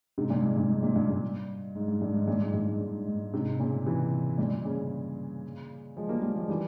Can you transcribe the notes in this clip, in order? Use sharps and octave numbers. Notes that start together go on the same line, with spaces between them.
G#2 C3
G2 A#2
G#2
G2
G#2
G2 A#2
G2
G2
G#2
G#2
G2
G#2
G2 A#2
G#2
G2
G#2
G#2
G#2
G#2 C3
A#2 C#3
C3 E3
G2 A#2
A#2 C#3
F3 G#3
G3 A#3
G3 A#3
F3 G#3
E3 G3